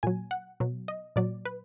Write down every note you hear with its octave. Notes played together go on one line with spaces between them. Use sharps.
A#2 F#3 G#5
F#5
B2 F#3
D#5
A#2 F#3 D5
B4